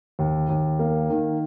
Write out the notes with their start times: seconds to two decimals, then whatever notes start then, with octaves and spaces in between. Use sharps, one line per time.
0.19 D#2
0.49 D#2
0.79 A#3
1.10 D#3